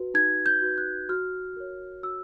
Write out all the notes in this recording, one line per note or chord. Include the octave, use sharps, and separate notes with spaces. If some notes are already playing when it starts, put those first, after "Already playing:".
Already playing: F#4 B4
D#4 G#6
G6
F#4 B4
F#6
F#4 F6
A#4 C#5
F#4 E6